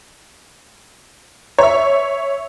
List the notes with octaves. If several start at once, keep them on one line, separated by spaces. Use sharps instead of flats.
C#5 E5